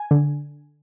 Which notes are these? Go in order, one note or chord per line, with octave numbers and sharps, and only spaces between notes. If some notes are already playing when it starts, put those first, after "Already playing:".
Already playing: G#5
D3